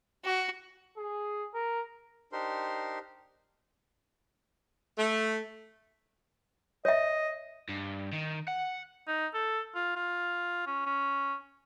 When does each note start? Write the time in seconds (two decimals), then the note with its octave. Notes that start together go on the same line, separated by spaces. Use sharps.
0.24 F#4
0.98 G#4
1.54 A#4
2.32 D4 D#4 G4 A#4 C5 C6
4.99 A3
6.85 C#5 D#5 E5
7.69 G2
8.13 D#3
8.48 F#5
9.08 D#4
9.34 A4
9.75 F4
9.96 F4
10.67 C#4
10.86 C#4